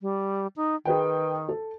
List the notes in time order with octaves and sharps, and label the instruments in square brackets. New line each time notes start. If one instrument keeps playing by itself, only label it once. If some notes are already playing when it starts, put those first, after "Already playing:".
[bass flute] G3
D#4
[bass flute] D#3 [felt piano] G#4 B4 G5
[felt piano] A4